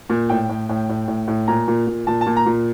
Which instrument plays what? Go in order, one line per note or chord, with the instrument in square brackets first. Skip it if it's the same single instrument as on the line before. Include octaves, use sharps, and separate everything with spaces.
[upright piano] A#2
A2 G5
A2
A2
A2
A2
A2
A#2 A#5
A#2
A#2
A#2 A5
A5
A#2
A#5
A#2